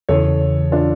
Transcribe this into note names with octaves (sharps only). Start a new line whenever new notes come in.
E2 C#3 E3 A4 C#5
D4 F4